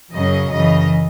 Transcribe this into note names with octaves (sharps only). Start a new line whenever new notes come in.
F#2 C#3 F#3 D#5
F#2 C#3 E3 D#5